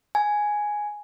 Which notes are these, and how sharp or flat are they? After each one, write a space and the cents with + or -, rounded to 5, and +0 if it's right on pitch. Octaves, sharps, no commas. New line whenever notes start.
G#5 +5